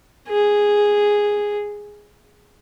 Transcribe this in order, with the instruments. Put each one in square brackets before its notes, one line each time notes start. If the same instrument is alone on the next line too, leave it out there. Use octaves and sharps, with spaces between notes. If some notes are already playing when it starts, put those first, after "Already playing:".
[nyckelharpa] G#4